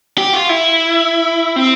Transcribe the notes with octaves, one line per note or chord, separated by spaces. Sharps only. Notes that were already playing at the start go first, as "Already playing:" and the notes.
G4
F4
E4
C4